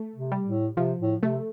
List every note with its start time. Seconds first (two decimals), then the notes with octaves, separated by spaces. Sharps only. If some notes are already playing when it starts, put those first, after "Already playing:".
Already playing: A3
0.16 C3
0.32 G3
0.47 A2
0.76 C3 F3
1.00 A2
1.22 C3 A3